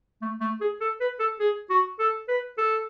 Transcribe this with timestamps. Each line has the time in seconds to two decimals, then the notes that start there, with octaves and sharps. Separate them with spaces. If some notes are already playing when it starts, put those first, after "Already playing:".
0.22 A3
0.41 A3
0.61 G#4
0.80 A4
1.01 B4
1.20 A4
1.40 G#4
1.70 F#4
1.99 A4
2.28 B4
2.58 A4